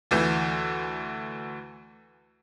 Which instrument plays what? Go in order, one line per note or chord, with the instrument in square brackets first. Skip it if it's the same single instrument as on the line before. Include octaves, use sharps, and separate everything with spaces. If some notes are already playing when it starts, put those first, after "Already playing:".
[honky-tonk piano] D2 E3 G6